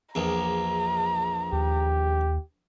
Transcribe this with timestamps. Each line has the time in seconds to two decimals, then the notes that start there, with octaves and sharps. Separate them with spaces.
0.15 A#1 E2 A#5
1.53 D#2 G4